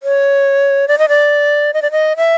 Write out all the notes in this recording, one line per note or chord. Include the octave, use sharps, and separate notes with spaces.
C#5
D5
D#5
D5
D#5
D5
D#5
E5